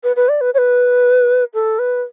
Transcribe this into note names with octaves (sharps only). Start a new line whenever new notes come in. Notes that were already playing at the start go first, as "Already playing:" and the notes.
B4
B4
D5
B4
C#5
B4
A4
B4